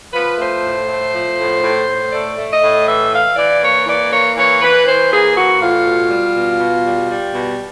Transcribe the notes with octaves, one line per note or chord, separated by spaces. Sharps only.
F3 B4
A3 C5
A2
A3
F3
A2
A2
A2
A3 D5
A3
D#5
A2
E3 E5
E3 F5
E3 D5
A#3 C#5
E3 D5
A#3 C#5
E3 C#5
E3 B4
E3 C5
A#3 G#4
E3 F#4
A2 F4
B2
G3
B2
B2
G3
G3
B2